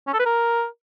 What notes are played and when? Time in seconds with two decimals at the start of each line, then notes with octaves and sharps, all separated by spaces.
0.07 C#4
0.14 A4
0.20 B4
0.26 A#4